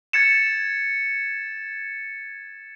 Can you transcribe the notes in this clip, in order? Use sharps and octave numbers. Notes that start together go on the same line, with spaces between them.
G#6 A6 C#7 E7